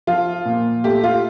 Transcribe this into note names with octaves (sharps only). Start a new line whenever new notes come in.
F3 F4
A#2
A3 G4
F4